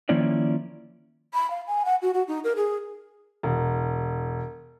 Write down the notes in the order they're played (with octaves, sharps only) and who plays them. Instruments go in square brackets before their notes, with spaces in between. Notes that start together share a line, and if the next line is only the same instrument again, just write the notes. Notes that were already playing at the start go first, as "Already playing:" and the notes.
[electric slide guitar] D#3 F3 A#3 C#4 E4 D5
[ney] B5
F5
G#5
F#5
F#4
F#4
D#4
A#4
G#4
[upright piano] E1